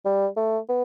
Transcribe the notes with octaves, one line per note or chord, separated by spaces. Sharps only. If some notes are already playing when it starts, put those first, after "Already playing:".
G3
A3
B3